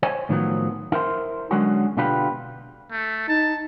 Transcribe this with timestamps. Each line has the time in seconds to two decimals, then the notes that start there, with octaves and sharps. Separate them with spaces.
0.03 C5 C#5 G#5
0.29 A2 D#3 F3 F#3 B3
0.92 E4 A#4 C5 C6
1.51 D3 F#3 G#3 C#4 F#4 G#4
1.97 B2 D3 F4 G4 B4
2.91 A3
3.28 D#4 A5